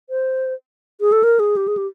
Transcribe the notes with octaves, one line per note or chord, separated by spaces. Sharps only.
C5
G#4
A4
A#4
G#4
G4
G#4
G4